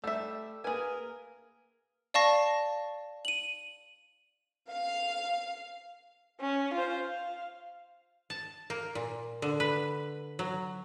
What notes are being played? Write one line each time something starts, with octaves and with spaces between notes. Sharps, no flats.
G3 A3 E5 E6
A#3 G#4 A#4 B4 G#5
D5 F5 A5 C#6 A#6
D#7 F#7
F5
C#4
F4 C5
F5
A5
A#3
A#2
D3
B4
F#3